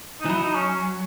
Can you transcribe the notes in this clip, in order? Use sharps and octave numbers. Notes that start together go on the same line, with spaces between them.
D#4
E3
F#3 E4
D#4
C#4
C#4